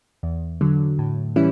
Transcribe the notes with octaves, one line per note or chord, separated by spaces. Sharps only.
E2
D3 F#3
A2
E3 G3 C#4 E4